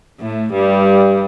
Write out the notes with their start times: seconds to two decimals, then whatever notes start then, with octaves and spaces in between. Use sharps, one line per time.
0.20 A2 A3
0.52 G2 G3